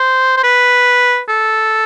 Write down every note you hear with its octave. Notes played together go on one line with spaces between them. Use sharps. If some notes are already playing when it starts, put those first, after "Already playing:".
Already playing: C5
C5
B4
A4